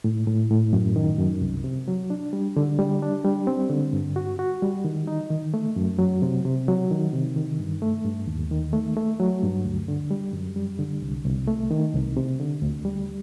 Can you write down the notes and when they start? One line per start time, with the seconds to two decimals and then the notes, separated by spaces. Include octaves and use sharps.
0.04 A2
0.27 A2
0.51 A2
0.73 F#2
0.96 D#3
1.19 F#2
1.42 C2
1.64 C3
1.88 F#3
2.10 D4
2.33 G3
2.57 D3
2.79 G3
3.02 D4
3.25 G3
3.47 C4
3.70 D3
3.93 G2
4.16 F#4
4.39 F#4
4.62 G3
4.85 D#3
5.07 D#4
5.31 D#3
5.54 A3
5.76 F#2
5.99 F#3
6.22 C3
6.45 C3
6.68 F#3
6.91 D#3
7.13 C3
7.36 D#3
7.60 G2
7.82 A3
8.05 G2
8.27 D#2
8.51 D#3
8.73 A3
8.97 A3
9.20 F#3
9.43 G2
9.65 D2
9.88 D3
10.11 G3
10.33 F#2
10.56 G3
10.79 D3
11.02 C2
11.26 C2
11.48 A3
11.71 D#3
11.94 C2
12.17 C3
12.40 D3
12.62 D2
12.85 G3